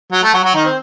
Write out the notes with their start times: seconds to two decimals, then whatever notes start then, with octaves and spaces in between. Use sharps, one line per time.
0.12 F#3
0.23 A3
0.33 F#3 F#4
0.44 F#3 F#4
0.55 D#3 D#4
0.65 C4